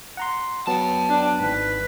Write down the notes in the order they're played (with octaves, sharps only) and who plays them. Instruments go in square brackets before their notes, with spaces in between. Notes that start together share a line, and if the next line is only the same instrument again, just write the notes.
[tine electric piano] F#5 A#5 C6
[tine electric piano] F#3 B3 [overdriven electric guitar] G5 A5
[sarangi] D4
[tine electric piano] G#1 G#2 [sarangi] B4